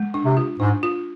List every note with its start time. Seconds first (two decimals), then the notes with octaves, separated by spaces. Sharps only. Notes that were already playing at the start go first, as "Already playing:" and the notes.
Already playing: G#3
0.14 D4
0.25 C3
0.37 F4
0.60 G#2 D4
0.83 F4